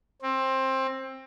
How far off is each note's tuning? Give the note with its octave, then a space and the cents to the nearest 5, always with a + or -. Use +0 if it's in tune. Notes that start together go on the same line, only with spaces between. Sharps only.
C4 +20